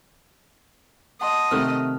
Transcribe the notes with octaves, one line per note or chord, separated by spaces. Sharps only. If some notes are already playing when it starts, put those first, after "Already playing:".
D#5 F#5 A5 C6
C3 D#3 A3 C4 F6